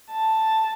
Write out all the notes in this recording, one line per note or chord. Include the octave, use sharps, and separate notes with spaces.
A5